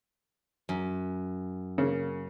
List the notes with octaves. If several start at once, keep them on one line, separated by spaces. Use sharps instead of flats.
F#2
C#3 A#3